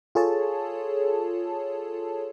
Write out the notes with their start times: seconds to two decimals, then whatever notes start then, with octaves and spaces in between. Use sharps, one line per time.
0.15 F4 G#4 A4 C#5 A5